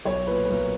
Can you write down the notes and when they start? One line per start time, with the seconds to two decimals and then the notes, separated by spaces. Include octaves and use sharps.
0.05 B1 C#5
0.27 A#2 B4
0.45 B4
0.50 B1 A#4